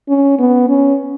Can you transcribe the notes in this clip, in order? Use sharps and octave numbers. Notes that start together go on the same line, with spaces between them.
C#4
B3
C#4